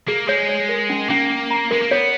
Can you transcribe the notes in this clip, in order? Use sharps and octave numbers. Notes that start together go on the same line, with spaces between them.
A#3 G#4
G#3 C#5
C#5
A#4
C#4
A#3 C#4
C#4
A#5
G#3 A#4
A#3
B3 C#5